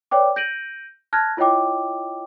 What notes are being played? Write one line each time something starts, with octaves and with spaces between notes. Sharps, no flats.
B4 C#5 D5 G5 D6
G6 A#6 D7 D#7 F#7
A5 F6 F#6 G#6 A#6
E4 F4 C#5 D#5 G5 D6